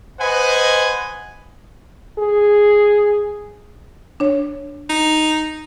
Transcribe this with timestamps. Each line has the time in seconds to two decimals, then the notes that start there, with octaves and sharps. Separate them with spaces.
0.20 B4 C5 D#5 F#5 G#5
2.19 G#4
4.20 D4 C#5
4.90 D#4